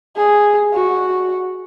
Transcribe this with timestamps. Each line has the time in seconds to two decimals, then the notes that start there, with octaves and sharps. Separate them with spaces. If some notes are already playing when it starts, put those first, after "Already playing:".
0.16 G#4
0.73 F#4